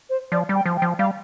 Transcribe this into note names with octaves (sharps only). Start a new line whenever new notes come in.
C5
F3 D5
G3
G5
F3
G5
F3
G3 F5